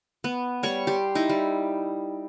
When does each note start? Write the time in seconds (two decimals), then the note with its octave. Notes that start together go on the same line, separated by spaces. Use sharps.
0.24 B3
0.63 G3 C#5 B5 C#6
0.87 G4 C6
1.15 D#4 E4
1.30 G3